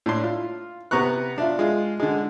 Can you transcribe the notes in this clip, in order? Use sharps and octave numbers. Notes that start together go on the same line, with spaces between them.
A2 D4 C6
F4
C3 B3 A#5 C#6 F#6
D4 E4 F4
G#3 F4
D3 G#3